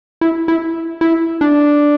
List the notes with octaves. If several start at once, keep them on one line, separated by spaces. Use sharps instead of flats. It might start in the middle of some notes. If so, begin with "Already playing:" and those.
E4
E4
E4
D4